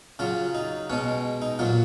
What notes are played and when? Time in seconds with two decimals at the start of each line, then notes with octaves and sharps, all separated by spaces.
0.19 C#3 F#3 F4
0.54 D#4
0.90 B2 G#3 C#4
1.42 D#4
1.59 A#2 F#3 F4